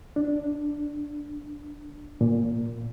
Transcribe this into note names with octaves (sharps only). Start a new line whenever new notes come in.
D4
A#2